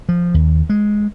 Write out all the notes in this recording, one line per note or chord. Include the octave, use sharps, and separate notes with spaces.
F3
D#2
G#3